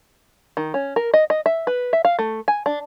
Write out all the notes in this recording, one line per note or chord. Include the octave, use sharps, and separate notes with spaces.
D#3
C#4
A#4
D#5
D#5
E5
B4
E5
F5
A3
G#5
D4